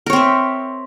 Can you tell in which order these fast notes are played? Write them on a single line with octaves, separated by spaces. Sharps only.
A#4 C#5 C4 E5